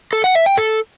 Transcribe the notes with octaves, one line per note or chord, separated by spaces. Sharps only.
A4
F#5
E5
G5
A4